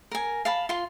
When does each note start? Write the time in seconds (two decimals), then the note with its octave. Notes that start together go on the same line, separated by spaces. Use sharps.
0.11 A#4 G#5
0.45 F5 A5 B5
0.69 F4 C6